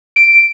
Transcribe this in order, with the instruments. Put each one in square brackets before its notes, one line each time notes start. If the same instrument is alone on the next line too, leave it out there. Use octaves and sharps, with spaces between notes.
[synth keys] D7